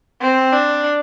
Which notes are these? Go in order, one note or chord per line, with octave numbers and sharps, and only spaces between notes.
C4
D4